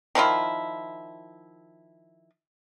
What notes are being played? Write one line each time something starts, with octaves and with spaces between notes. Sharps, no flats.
D#3 F3 E4 F4